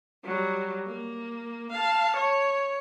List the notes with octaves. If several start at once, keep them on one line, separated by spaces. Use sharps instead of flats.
F#3 G3
A#3
F5 A5
C#5